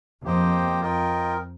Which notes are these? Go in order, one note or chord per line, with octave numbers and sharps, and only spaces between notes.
F2 A#3 G4 C5 D#5 G5
F2 F4 A#4 D#5 G5